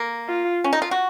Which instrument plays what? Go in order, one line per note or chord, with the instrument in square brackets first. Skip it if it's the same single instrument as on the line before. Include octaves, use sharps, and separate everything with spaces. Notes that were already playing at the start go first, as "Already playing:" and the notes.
Already playing: [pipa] A#3
[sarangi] F4
[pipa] C#4
D#4
F4
F#4